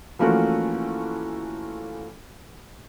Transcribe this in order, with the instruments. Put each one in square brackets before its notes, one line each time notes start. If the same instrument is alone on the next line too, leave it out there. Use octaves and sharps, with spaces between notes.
[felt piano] E3 F3 A3 A#3 C#4 F#4